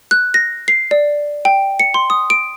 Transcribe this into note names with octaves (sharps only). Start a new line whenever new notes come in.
F#6
A#6
C7
D5
G5
C#7
C6
D#6
D7